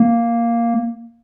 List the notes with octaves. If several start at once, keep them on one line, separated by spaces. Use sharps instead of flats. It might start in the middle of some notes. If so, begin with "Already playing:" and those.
Already playing: A#3